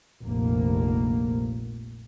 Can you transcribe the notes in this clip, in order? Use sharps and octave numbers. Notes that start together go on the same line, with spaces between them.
F1 A#1 A#3